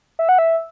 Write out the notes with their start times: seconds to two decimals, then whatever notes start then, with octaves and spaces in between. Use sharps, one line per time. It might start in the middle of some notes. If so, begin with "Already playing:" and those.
0.19 E5
0.29 F#5
0.39 E5